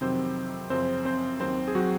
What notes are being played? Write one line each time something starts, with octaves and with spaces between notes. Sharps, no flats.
F2 C3 D#3 F#3 C4 C5
F#2 C#3 F3 C4 C5
C4 C5
D#2 D#3 F#3 C4 C5
G#4
F#3 F#4